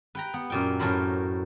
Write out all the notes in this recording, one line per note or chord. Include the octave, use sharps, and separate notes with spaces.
B4 G5 A#5
B3
F#2 A#2 G5
F#2 A2 A4 A#4 C5 B5